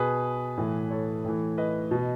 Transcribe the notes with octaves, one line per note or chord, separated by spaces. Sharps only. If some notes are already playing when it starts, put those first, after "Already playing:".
Already playing: B2 G#4 B4
A2 E3
A4 C#5
A2 E3
B4 D#5
B2